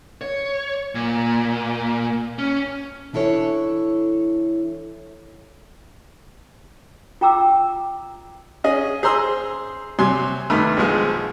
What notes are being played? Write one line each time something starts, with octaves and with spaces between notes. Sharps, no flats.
C#5
A#2
C#4
E3 D4 E4 A4 C#5
F4 G5 A#5 D6 E6
C#4 G#4 D#5
G#4 C5 A#5 C6 E6
C3 F#3 G#5 C6
G2 D#3 A3 B5
B1 F3 G#3